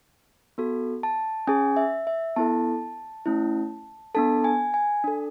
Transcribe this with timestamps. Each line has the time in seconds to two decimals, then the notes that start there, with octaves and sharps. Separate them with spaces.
0.58 B3 F#4 A4
1.03 A5
1.47 C#4 G#4 G#5
1.77 E5
2.07 E5
2.36 B3 E4 A4 A5
3.26 A3 C#4 E4
4.15 B3 D4 A4 A5
4.44 G#5
4.74 G#5
5.04 D4 A4